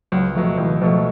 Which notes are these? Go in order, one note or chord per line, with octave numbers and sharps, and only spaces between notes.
C#2 F#3
B2 F3 F#3 A3
C#2 E3
B2 F3 F#3 A3